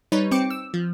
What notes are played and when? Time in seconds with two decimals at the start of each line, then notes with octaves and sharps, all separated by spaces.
0.12 G3 D#4 B4 C#5
0.31 C4 G5 D6 C#7
0.50 E6
0.74 F3